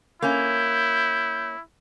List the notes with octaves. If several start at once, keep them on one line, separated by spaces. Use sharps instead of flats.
A#3 C#4 E4 G6